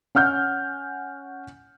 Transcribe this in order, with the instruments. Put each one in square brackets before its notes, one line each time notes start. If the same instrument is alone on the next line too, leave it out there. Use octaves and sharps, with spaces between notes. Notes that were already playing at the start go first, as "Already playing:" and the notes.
[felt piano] C#4 F#5 F6 G6